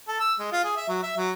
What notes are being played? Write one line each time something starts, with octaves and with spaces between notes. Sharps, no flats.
A4
E6
G#3
F4
G#4
E5
F#3
E5
F#3